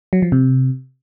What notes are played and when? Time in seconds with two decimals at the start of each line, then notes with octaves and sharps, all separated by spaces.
0.13 F#3
0.22 F3
0.32 C3